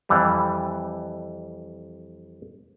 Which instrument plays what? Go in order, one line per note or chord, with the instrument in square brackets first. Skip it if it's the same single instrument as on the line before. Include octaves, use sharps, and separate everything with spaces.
[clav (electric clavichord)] F2 E3 G3